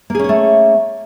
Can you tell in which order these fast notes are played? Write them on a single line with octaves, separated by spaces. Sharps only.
A#3 G#4 C#4 C#5 A3